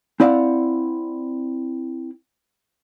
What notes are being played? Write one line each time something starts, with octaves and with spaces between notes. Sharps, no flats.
C4 E4 D5 D#5 F5 F#5